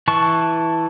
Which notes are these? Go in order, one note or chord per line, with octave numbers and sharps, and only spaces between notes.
E3 A5 C#6